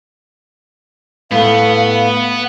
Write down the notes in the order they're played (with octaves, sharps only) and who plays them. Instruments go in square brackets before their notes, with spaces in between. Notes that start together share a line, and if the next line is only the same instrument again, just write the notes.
[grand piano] A2 A3 [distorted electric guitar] B3 [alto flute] F5